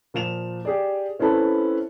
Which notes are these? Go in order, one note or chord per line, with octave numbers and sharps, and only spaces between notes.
A#2 F3 E7 F7
G4 G#4 D5
C4 C#4 E4 A4 B4